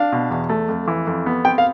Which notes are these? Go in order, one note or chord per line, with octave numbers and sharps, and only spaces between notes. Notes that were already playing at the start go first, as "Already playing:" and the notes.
Already playing: D4 F5
B2
E2
A3
F2
E3
F2
B3
C4 G5
F5